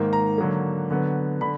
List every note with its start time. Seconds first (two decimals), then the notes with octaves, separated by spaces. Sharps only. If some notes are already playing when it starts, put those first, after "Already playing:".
Already playing: G#2 D#3 A#3
0.13 A#5
0.38 D3 F#3 A#3
0.90 D3 F#3 B3
1.41 D3 B5